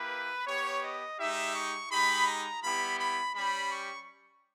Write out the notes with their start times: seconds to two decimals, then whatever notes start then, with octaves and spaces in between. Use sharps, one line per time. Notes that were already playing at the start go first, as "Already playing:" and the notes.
Already playing: A#3 E4 G4 B4
0.47 B3 G4 C#5
0.83 D#5
1.19 G#3 D#4 G4 E5
1.55 C#6
1.91 G#3 D#4 G4 B5
2.27 A#5
2.63 G3 B3 E4 G4 B5
2.99 B5
3.36 G3 C#4 G4 B5
3.72 C#6